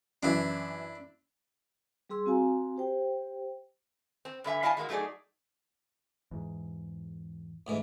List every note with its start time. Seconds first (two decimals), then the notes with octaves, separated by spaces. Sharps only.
0.23 F#2 E3 D4 E4
2.10 G3 G#4 C6 E6
2.26 C4 F#4 F5 G#5 A#5
2.76 G4 C5 G5
4.25 C4
4.44 G2 D3 E5 G#5
4.63 E4 D5 D#5 F5 G#5 A5
4.77 G#3 A#3 E4 F#4
4.89 F#3 A3 D#4 E4 G#4 D5
6.31 E2 G#2
7.67 D2 G#2 E3